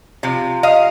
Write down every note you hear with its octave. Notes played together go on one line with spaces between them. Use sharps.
C3 F3
D#5 F5